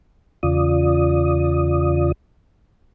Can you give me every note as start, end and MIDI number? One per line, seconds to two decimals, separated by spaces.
0.43 2.12 40
0.43 2.12 49
0.43 2.12 65
0.43 2.12 74
0.43 2.12 87